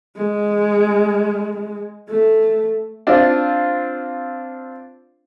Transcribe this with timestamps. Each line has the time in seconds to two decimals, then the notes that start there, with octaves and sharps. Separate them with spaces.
0.16 G#3
2.10 A3
3.07 C4 D4 F4